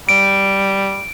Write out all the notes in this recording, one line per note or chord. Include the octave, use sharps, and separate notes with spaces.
G3 D7